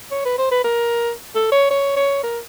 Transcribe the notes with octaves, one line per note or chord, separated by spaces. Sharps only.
C#5
B4
C5
B4
A#4
A4
C#5
C#5
C#5
A#4